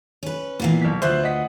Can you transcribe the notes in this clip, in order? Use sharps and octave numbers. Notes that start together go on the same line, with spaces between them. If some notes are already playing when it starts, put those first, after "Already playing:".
C#4 B4
A#2 E3 A#3 B3
B1 B6
D2 F4 B4 C5 E5 F#6
D#5 F#5 B6